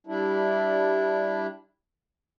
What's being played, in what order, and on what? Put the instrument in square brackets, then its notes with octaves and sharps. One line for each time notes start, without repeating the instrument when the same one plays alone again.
[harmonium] G3 D4 E4